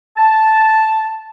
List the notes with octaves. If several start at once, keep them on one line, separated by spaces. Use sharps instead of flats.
A5